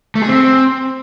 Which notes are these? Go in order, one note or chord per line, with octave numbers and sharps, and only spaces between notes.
A3
G#4
C4